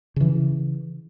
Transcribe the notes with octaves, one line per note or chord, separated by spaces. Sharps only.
C#3 E3